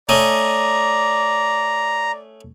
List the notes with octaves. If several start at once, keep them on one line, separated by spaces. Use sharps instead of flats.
A3 C#4 D5 D#5 A#5